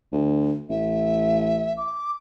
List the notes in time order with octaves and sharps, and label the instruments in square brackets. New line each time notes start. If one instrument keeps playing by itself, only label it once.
[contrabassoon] D2
[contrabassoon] A1 [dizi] E5
[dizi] D6